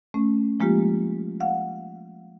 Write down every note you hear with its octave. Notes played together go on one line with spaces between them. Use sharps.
A3 C#4
F3 G#3 A#3 F4 G4
F5 F#5